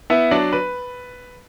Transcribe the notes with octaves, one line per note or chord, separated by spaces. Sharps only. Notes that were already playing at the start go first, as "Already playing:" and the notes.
B3 E4 E5
F#3 D4 D5
B4